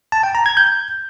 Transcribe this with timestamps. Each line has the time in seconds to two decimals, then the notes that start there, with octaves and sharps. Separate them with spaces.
0.12 A5
0.23 G5
0.35 A#5
0.46 G#6
0.57 G6